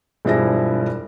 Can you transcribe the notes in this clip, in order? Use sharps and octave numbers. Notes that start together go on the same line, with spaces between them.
E1 G2 F3 E4 G#4 A#6